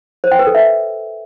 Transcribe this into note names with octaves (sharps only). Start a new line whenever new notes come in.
C5
G5
B4
A4
E5